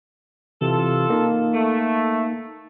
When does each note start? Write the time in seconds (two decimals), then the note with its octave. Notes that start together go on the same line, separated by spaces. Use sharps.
0.61 C3 E3 F4 A4
1.10 A#3 D#4
1.53 A3